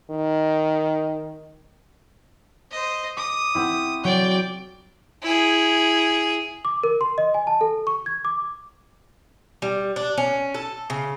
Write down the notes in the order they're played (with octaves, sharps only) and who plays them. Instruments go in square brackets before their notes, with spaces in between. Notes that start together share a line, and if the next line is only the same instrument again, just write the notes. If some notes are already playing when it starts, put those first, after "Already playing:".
[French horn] D#3
[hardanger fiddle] C5 D#5
[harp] D6 [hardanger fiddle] D#6
[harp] B3 C4 E4
[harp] F#3 [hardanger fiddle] D5 G5
[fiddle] E4 G#4
[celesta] D6
A#4
C6
D#5
G#5
A5
A4
C#6
G#6
D6
[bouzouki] G3
D4
C#4
A4
C#3